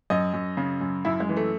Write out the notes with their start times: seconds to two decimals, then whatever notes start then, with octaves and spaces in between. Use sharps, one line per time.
0.10 F#2 D#5
0.34 F#2
0.57 C#3
0.81 F#2
1.05 F#2 E4
1.20 G#3
1.29 E3
1.37 A3